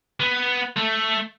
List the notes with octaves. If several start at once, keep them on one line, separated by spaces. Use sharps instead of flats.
B3
A3